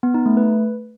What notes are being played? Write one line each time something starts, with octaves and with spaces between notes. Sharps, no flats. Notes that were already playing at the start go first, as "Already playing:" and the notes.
B3
D#4
A3
B4